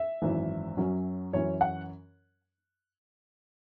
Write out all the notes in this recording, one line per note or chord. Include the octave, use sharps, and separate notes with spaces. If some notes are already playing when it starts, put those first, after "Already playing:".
Already playing: E5
G#1 F#2 E3
F#2 F#3 C#4
F#2 E3 C#4 C#5
F#5